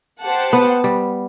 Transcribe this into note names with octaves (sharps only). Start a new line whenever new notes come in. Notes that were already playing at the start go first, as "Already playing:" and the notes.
G4 C5 F#5 A5
B3
G3